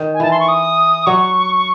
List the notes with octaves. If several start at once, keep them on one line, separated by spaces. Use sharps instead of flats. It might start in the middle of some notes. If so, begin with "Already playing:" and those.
Already playing: D#3
G#5
E3 A5
C6
C#6
D#6
F#3 C#6